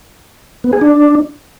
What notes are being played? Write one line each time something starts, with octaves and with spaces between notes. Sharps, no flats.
B3
G#4
D4